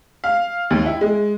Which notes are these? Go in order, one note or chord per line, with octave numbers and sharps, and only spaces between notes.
F5
D#2
E4
G#3